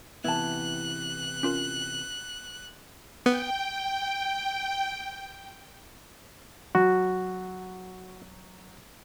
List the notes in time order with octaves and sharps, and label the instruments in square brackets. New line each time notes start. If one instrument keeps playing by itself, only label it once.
[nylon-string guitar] C3 E3 B3 [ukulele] E4 A5 [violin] F#6
[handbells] C#4 F4 A#4
[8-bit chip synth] B3 [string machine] G5
[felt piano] F#3 [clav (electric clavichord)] F#4